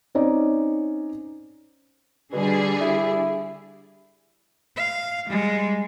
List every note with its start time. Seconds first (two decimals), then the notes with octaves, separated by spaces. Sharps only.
0.15 C4 C#4 D#4 D5
2.32 B2 D3 G3 G#4
2.81 E4
4.76 F5
5.27 G3 G#3